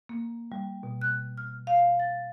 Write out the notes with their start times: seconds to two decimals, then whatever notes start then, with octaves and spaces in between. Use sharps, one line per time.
0.09 A#3
0.52 G3
0.83 B2
1.01 F#6
1.38 F6
1.67 F5
2.00 A6